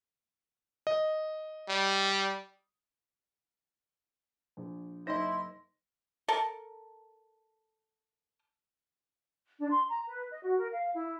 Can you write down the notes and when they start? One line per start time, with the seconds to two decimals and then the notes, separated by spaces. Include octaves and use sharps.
0.87 D#5
1.69 G3
4.57 A#1
5.07 F#1 D#4 E4 C5 D#5 C6 A#6
6.28 A4 A#4
9.59 D4
9.71 C6
9.88 A#5
10.07 B4
10.30 D#5
10.43 F#4
10.57 A#4
10.72 F5
10.93 E4